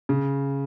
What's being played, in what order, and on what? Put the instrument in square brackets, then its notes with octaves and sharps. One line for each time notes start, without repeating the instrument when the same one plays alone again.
[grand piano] C#3